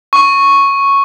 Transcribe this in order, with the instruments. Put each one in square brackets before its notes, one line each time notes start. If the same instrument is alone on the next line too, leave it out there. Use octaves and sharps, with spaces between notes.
[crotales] C#6